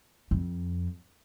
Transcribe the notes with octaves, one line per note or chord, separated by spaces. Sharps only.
F2